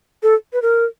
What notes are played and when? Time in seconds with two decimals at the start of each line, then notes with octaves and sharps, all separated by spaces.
0.23 A4
0.53 B4
0.62 A#4